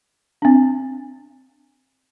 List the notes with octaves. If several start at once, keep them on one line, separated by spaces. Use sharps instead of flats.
C4 D4